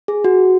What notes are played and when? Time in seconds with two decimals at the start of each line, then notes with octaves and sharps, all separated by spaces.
0.08 G#4
0.24 F#4